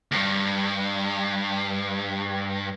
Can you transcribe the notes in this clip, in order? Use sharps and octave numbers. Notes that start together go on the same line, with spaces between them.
D2 G2